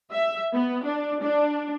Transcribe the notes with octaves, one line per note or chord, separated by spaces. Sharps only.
E5
B3
D4
D4